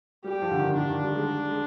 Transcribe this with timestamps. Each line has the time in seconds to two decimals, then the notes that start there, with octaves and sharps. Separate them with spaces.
0.24 G3 G4
0.42 F3
0.51 D3
0.59 D#3
0.68 D3
0.77 D#3 D4
0.90 D#3
1.04 G3
1.16 G#3
1.50 G#3